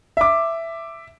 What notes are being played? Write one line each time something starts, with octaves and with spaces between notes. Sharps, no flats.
E5 D6